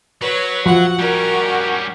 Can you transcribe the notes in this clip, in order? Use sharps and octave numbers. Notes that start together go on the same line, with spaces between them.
F#3 B4 C#5
F3 F#4 F#5
G3 C#4 A#4